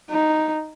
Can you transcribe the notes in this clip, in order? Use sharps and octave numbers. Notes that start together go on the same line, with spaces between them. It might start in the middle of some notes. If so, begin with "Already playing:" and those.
D#4